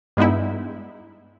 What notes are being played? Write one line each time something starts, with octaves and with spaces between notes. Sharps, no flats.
G2 G#3 B3 D#4 E4